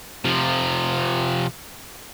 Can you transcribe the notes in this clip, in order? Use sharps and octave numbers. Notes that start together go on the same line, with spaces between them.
C3 F3